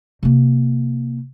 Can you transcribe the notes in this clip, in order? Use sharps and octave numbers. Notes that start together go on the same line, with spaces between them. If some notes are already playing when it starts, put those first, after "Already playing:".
C3 A#3